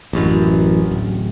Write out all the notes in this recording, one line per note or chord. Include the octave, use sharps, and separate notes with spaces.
A1 F#2
D1